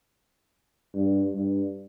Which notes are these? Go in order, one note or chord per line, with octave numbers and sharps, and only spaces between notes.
G2
G2